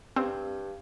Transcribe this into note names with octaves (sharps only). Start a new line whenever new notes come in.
G2 C4